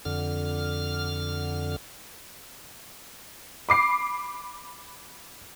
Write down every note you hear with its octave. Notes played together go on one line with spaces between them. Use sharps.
F2 D3 F6
B5 D6 C7